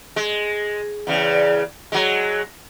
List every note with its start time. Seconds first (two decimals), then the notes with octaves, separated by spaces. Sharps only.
0.16 G#3
1.07 E2 C#3
1.92 F#3 G#3